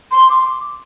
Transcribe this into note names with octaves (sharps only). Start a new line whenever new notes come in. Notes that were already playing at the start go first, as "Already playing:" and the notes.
C6
D6